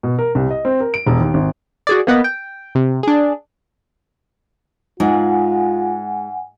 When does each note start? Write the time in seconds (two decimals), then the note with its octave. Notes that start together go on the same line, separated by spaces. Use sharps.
0.03 B2
0.19 A#4
0.35 C2
0.51 D#5
0.65 C4
0.80 A#4
0.94 D7
1.06 E1
1.20 D#2
1.34 G#1
1.87 F#4 G#4 D5
2.07 A#3 B3 B4 D#5
2.24 G5
2.75 C3
3.03 D4 G#4
5.00 G#2 G#3 F4 F#5 G#5